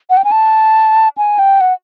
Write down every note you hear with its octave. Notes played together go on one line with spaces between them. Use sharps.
F#5
G5
G#5
A5
G#5
G5
F#5